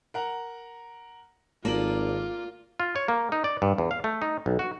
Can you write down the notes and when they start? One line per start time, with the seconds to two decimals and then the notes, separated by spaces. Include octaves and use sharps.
0.14 A#4 F#5 A#5
1.65 G#1 A#3 F4 A4 A#4 D5 F#7
2.80 F4
2.96 C#5
3.08 A#3
3.32 D#4
3.44 D5
3.62 G2
3.78 E2
3.91 F5
4.04 A3
4.22 D#4
4.46 B1
4.59 F#4